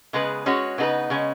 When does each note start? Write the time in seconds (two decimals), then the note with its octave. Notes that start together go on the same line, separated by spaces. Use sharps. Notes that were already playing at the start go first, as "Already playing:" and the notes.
0.13 C#3 G#3 B3 G#4 B4
0.46 G#3 C#4 F#4 C#5
0.78 C#3 B3 D#4 G#4 B4
1.10 C#3 G#3 C#4